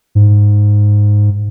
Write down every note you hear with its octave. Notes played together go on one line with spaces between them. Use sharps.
G#2